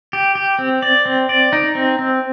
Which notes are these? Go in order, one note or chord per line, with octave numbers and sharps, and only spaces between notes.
G4
G4
C4
D5
C4
D5
D#4
C4
C4